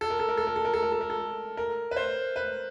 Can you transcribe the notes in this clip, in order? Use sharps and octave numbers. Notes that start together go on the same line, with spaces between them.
A4
A#4
A4
A#4
A4
A#4
A4
A#4
A4
A#4
A4
A#4
A4
A#4
B4
C5
B4